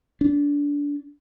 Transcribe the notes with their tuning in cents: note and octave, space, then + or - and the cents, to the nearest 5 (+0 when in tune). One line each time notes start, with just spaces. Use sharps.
D4 -25